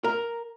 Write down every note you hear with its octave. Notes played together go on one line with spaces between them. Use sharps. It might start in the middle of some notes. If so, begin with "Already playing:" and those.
A#4